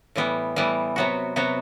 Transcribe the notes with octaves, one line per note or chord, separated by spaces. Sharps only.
A2 E3 G3 B3
A2 E3 G3 B3
C3 F#3 B3 F#4
C3 F#3 B3 F#4